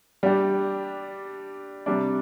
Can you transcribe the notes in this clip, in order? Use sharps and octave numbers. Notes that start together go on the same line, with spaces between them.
G3 D4 G4
C3 G3 D4